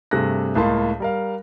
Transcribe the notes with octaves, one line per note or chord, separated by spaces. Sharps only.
G2 C3 A3 G#4 F#6 A#6
C#2 A2 A#3 A5 C6
G3 A#4 F5